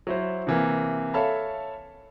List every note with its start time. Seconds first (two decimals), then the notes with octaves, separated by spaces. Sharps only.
0.07 F#3 E4 C5
0.47 C3 E3 A#3
1.14 A4 C#5 E5 F5 A5 B5